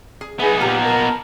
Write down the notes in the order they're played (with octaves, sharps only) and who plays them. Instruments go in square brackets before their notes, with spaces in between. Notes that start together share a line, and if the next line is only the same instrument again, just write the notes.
[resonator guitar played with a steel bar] G#4
[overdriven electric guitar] B3 D#4 [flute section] G#4 B4 [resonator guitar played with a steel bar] E5
[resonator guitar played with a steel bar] A#2 F3 A#5 [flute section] G4
[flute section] A#4 A5